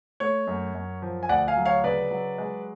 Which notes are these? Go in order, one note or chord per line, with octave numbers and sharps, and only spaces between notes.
A3 C#5
F#2
F#2
F3
G#5
D2 D5 F#5
F5 G#5
F#3
C#5 F5
C#3 B4 D5
F#3
G#3